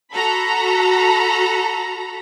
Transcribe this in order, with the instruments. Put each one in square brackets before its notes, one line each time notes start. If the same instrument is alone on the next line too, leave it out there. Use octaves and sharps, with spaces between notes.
[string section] F#4 A4 A#5 B5